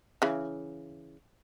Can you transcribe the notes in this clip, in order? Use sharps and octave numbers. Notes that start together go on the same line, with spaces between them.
C#3 E3